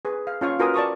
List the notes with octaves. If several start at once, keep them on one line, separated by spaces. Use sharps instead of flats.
G#4 B4
F5
C#4 F4 F5 C#6
F4 F#4 A#4 B4 G#5 D#6
D5 A5 C#6 D#6